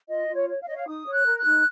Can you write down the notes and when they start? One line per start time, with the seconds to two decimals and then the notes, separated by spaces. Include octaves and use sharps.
0.08 F4 D#5
0.28 F4
0.35 C#5
0.48 C#5
0.61 F5
0.67 C#5 D#5
0.75 F5
0.87 D#4 D#6
1.06 C#5
1.12 F#6
1.26 A#4
1.38 F#6
1.44 D#4